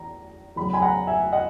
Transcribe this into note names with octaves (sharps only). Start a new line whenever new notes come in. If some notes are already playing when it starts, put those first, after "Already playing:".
Already playing: E2 A#5
E2 C#3 F#3 B5
G#5 B5
F#5 A#5
E5 G#5
D#5 F#5